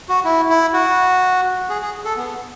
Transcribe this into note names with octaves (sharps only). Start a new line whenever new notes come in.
F#4
E4
E4
F#4
G#4
G#4
A4
B3